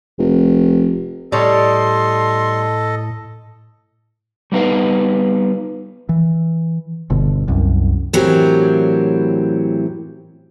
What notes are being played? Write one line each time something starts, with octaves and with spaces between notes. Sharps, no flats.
F1
A2 G3 A4 C#5 D#5 C6
G3 B3 D#4 B4 F5
E3
G1 B2 D3
C2 F#2
A2 E3 F#3 C4 G4 A#4